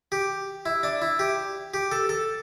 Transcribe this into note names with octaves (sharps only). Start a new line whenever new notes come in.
G4
E4
D4
E4
G4
G4
A4
A4